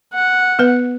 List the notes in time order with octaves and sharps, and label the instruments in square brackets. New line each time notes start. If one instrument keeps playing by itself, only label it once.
[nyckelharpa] F#5
[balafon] B3 B4